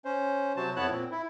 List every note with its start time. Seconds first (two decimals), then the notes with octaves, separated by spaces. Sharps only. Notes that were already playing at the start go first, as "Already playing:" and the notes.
0.05 C#4 C5
0.56 C3 F#3 F#4 C5 A5
0.76 F2 B3 E4 C#5 A5 F#6
0.90 A#2 C4
1.11 E4